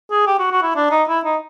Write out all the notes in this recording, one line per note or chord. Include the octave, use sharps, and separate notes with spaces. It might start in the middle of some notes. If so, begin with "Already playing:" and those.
G#4
G4
F#4
F#4
E4
D4
D#4
E4
D#4